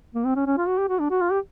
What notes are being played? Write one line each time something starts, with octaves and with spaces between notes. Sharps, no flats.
A#3
C4
C#4
C#4
F4
F#4
G4
F#4
D4
F#4
F4
G4